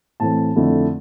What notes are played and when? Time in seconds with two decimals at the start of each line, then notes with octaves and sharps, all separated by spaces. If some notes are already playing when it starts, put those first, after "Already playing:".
0.20 A2 E3 A3 C4 A5
0.56 F2 D3 A3 E4